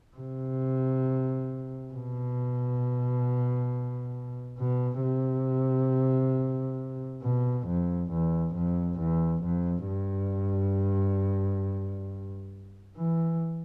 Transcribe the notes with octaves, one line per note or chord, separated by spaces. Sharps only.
C3
B2
B2
C3
B2
F2
E2
F2
E2
F2
G2
E3